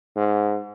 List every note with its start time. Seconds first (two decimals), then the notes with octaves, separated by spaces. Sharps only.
0.16 G#2